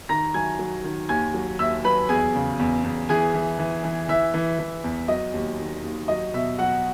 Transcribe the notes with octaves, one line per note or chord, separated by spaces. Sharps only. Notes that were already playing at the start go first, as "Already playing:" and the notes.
D#3 A#5 A#6
F#3 G#5 G#6
F#3
D#3
D#2 G#5 G#6
F#3
D#2 E5 E6
F#3 B4 B5
E2 G#4 G#5
C#3
E2
E2
E3 G#4 G#5
E3
E3
E3
E3 E5
E3
E3
E2
F#3 D#5
D#2
D#3
D#2
F#3 D#5
B2 E5
F#3 F#4 F#5